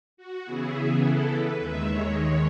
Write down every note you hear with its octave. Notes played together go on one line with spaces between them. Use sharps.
F#4
C#3 E3 B3 E4 G#4
G#4
A4
B4
D#2 D#3 G#3 E5
C#5
C#5